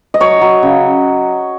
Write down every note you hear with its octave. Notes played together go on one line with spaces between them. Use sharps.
D#5
F#3 C#5
F#3
C#3